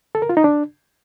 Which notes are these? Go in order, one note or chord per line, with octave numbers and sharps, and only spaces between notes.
A4
A#4
F4
D#4
D4